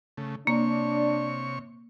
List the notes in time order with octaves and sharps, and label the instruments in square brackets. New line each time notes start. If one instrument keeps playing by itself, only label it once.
[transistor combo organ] C#3 A3
[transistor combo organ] C3 C#5 C#6 [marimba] A#3 [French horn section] D4